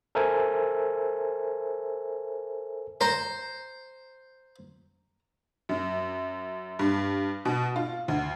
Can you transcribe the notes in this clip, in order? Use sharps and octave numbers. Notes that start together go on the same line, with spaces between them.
A4 A#4 C5 E5 G#5
C5 A#5
F#2
G2
B2
F4
D2